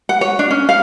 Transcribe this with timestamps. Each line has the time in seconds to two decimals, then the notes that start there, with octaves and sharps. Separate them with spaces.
0.09 F#5
0.21 C#5
0.39 D4
0.51 C#4
0.69 F5